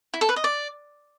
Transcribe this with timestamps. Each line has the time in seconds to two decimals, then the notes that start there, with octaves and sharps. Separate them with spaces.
0.14 E4
0.21 A4
0.29 B4
0.36 D#5
0.44 D5